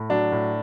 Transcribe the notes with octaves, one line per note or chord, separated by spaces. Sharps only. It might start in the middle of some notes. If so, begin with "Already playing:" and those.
Already playing: A2
F#3 D4
A2